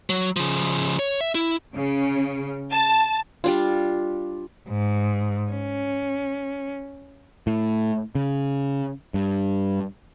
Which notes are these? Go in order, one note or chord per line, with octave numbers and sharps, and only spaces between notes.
F#3
C#3 F3
C#5
E5
E4
C#3
A5
G3 D4 F4
G#2
C#4
A2
C#3
G2